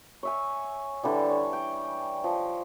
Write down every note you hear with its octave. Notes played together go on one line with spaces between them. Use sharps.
C#5 E5 G#5
D3 E3 G3
C#5
G5
F3